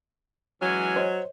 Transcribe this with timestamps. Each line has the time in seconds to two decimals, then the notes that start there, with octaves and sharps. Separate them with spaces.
0.62 E3 F#3 G#3 C#4
0.96 C5 C#5 D#5